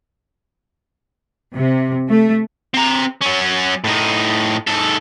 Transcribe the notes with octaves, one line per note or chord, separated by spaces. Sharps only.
C3
A3
C4 A#5
F#3 C#4
A2 D#4
G#2 A4